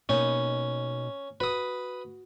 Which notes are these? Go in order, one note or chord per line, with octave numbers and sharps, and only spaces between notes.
B2 A#3 C#4 D#4
F#4 B4 D#6